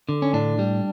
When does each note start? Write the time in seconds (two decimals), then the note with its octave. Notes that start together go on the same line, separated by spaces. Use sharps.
0.09 D3
0.22 C#4
0.33 A2 D4
0.59 G3